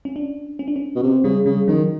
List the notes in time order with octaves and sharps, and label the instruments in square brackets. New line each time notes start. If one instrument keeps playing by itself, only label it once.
[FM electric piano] C#4
D4
C#4
D4
C#4
[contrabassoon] B2
C3
[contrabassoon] C#3 [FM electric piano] G3
[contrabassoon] C#3 [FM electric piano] G3
[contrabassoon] D#3 [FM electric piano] F#3